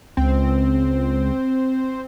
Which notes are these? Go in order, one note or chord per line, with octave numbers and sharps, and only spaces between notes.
C#2 C4